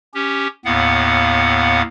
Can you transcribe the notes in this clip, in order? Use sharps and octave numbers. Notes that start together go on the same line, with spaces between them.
C#4 G4
D#2 A2 B3 F5 F#5